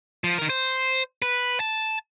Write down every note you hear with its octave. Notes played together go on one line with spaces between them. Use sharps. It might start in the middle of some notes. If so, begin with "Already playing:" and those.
F3
D#3 A#4
C5
B4
A5